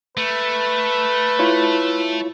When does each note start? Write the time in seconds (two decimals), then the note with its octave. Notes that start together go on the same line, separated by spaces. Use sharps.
0.17 A3 B4
1.39 E4 F4 C#5